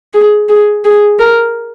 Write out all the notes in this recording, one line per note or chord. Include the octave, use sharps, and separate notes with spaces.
G#4
G#4
G#4
A#4